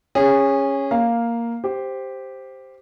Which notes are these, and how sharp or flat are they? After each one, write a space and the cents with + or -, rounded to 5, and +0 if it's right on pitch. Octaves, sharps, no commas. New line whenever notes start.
C#4 -5 G#4 -25
A#3 +0 F5 +0
G4 +0 C5 +0